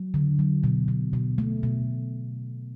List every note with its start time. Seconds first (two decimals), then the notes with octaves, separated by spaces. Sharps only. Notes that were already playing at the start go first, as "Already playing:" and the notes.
Already playing: F#3
0.14 D3
0.39 F#3
0.64 B2
0.88 B2
1.13 B2
1.38 A3
1.63 B2